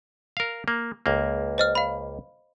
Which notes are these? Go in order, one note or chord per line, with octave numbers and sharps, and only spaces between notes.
A#4 F5
A#3
C#2 A#3
C5 D#5 F6
F5 B5